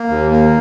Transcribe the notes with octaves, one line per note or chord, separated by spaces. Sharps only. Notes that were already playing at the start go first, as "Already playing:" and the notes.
Already playing: A#3
D#2
A#3